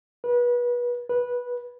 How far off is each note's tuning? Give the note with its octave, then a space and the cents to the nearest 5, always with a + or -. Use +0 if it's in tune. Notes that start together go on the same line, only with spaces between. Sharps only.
B4 -30
B4 -15